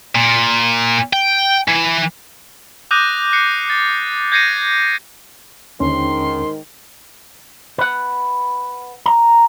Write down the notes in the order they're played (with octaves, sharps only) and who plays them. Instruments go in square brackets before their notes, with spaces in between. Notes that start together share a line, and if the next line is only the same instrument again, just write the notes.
[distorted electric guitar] A#2
G5
E3
[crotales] D6 D#6 F#6 G6 A#6 D#7
F#6 C7 C#7
A6
G6 G#6 A#6 C7 C#7 D#7
[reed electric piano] D#2 D3 C#4 [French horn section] G#2 D#3 [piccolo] C6
[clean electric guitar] B4 F#5
A#5